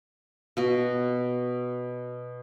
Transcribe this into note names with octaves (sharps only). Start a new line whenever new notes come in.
B2 F#4